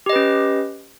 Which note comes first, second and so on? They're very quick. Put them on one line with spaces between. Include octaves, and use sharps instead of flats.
G4 D#5 B4 C#4